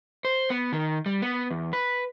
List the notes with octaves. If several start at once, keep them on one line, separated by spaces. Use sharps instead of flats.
C5
B3
D#3
G3
B3
E2
B4